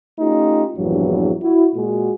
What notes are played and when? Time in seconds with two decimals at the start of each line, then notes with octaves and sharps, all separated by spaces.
0.19 A3 C#4 D#4 F4 G4
0.77 A#1 E2 G2 E3 F#3
1.42 E4 F#4
1.75 A#2 G#3 F#4